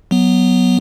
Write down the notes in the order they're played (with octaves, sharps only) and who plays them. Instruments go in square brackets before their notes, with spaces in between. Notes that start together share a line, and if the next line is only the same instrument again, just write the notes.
[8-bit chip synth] F#3 B3